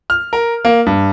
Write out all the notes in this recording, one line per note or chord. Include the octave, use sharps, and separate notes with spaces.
F6
A#4
A#3
G2